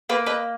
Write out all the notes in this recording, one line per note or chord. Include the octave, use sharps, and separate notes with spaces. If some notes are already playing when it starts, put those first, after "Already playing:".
A#3 B4
B4 D#5